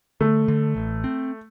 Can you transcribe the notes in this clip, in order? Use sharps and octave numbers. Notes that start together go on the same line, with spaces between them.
D3 A3
D3
A1
C4